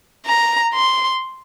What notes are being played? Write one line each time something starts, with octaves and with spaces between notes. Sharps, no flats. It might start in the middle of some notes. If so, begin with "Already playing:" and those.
A#5
C6